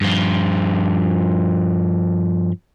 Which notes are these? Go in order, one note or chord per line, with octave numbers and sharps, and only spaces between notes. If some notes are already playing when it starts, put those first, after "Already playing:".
G2 F3